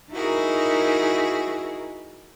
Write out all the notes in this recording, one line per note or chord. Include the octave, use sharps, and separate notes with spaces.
D#4 E4 F#4 G#4 A#4